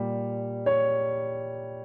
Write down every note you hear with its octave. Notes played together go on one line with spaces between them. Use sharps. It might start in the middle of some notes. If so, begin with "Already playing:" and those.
Already playing: A#2 G3
C#5